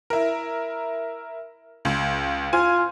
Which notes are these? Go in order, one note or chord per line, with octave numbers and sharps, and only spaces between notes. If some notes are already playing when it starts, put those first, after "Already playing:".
E4 A#4
C#2
F4 G#5